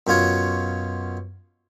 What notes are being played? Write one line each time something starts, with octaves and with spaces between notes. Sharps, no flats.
F#2 B2 F4 C#5